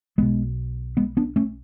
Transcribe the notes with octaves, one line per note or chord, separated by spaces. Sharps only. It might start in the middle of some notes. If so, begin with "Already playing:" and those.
B1 B2 G#3 B3
G#3 B3
B3 D4
A3 C#4